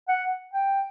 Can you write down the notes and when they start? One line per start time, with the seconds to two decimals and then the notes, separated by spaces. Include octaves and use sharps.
0.08 F#5
0.54 G5